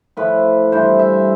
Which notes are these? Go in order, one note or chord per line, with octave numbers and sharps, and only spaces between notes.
A2 F3 A3 B4
G2 E3 G3 C5
E5